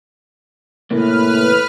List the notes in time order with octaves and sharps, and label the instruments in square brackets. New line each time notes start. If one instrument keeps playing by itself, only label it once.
[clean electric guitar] D#2 C3 A#3 [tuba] A2 [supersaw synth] B4 F6